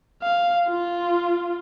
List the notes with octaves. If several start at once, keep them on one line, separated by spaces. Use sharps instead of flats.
F5
F4